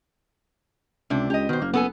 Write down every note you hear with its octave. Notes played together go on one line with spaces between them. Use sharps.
C#2 C3 D4
C#2 G4 D#5
B2 D#3 C5
F#1 A#3
B3 A4 G#5